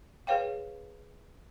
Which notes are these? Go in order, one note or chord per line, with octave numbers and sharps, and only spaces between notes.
G#4 B4 C#5 F5 G5